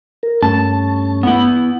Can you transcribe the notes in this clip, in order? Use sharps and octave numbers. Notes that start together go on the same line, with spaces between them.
A#4
G2 A3 C#4 A5
B3 E4